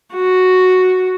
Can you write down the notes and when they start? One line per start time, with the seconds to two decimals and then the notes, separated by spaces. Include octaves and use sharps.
0.15 F#4